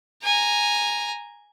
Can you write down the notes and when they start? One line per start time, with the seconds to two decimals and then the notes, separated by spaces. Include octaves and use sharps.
0.24 G#5 A#5